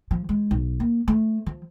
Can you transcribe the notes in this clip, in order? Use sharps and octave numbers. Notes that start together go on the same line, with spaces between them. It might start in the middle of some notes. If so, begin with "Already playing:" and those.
F3
G#3
B1
A#3
A3
F3